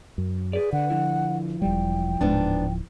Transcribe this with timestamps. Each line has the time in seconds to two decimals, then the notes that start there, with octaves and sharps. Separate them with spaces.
0.18 F#2
0.53 G#4 B4 D5
0.73 D3 F#5
0.90 F3 E4
1.62 E1 G3 G5
2.21 D1 G#2 B3 D4